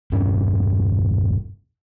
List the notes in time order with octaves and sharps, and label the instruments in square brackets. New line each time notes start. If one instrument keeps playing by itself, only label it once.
[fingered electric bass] E1 G2 C#4